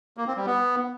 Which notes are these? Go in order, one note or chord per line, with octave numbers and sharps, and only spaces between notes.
A#3
C4
G3
B3